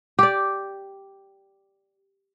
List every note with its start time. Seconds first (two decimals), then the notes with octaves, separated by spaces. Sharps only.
0.19 G4 D5